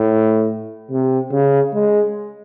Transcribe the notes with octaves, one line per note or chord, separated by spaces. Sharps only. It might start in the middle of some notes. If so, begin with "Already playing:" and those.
Already playing: A2
C3
C#3
G#3